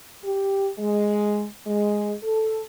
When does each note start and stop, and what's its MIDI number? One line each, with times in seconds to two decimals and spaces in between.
0.24 0.69 67
0.78 1.46 56
1.67 2.14 56
2.23 2.63 69